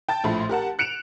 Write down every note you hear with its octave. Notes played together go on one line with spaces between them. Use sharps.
G5 A5 A6
A#1 A2 A3 F4 B5 C6
G4 A#4 F#5 A5
F#6 C#7 D7 E7 F7